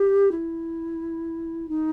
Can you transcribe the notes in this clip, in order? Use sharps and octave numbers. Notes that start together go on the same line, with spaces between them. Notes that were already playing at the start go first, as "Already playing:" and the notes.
Already playing: G4
E4
D#4